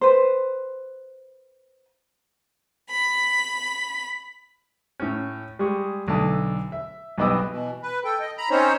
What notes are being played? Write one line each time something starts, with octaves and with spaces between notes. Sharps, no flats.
B4 C5
B5
A2 C#4
G3 G#3 G#4 C#6
B1 D3 A3 A5 D#6
E5
B1 G2 B3 D#5 D6 E6
B2 E3
B4
A4 G5
D#5
A#5 B5
C4 C#4 D#4 C5 C#5